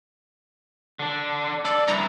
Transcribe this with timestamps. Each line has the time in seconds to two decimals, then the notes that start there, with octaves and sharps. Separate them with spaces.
0.99 D3 D4
1.65 A4 D5
1.88 G2 E4 A#5